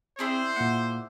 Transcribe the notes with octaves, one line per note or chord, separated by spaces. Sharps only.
C4 E4 G#4 C5 D5
A#2 A#3 F#5